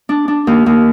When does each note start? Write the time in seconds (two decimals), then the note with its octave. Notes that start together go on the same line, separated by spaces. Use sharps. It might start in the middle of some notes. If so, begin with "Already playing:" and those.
0.09 D4
0.28 D4
0.47 D#2
0.66 D#2